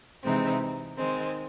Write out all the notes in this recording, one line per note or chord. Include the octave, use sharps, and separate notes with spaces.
C3 E3 G#3 C4 D#4
D#3 G#3 C4